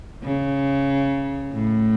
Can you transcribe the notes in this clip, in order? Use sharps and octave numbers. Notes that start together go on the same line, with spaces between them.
C#3
A2